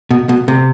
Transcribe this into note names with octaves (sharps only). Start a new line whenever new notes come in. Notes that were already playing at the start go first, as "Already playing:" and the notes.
B2
B2
C3